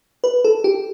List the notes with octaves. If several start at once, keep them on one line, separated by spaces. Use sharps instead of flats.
B4
A4
G4